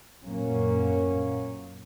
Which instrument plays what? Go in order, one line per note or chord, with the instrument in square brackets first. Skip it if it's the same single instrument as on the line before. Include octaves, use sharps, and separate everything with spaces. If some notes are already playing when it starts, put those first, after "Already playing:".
[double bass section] F#2 A#2 F#3 A#3 C#4